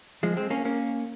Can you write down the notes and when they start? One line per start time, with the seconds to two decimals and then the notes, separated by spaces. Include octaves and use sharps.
0.23 F3 G#3
0.37 G#3 C4
0.50 A#3 C#4
0.65 A#3 C#4